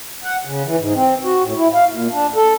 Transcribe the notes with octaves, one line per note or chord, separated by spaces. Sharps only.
F#5
C#3
E3
G#2
C4
F#4
A2
E4
F5
A#2
D4
A4